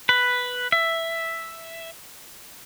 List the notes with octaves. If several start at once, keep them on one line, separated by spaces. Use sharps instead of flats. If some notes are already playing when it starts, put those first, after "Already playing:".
B4
E5